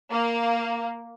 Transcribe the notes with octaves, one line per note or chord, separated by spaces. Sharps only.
A#3